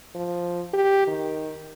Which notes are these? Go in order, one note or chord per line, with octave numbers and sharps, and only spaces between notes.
F3
G4
D#3